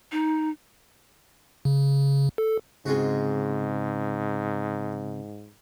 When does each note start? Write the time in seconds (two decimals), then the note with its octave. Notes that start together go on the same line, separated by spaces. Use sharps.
0.12 D#4
1.65 C#3
2.38 A4
2.86 G#2 C#3 G#3 C4 F4 F#4